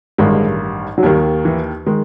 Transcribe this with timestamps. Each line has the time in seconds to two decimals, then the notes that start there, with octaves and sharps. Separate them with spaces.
0.18 A1 G2 D#3 G#3
0.98 F#3
1.03 D#2 D#3 G3
1.45 E3
1.87 D#3 G#3